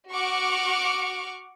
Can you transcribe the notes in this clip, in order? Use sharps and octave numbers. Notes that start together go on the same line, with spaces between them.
F#4 F#5 C#6 D6 F6